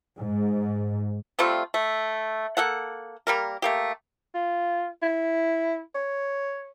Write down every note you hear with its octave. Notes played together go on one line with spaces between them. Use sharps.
G#2
G3 A3 C4 F4
A3
A#3 A4 F#5
G3 A#3 A#4
A3 A#3 G4
F4
E4
C#5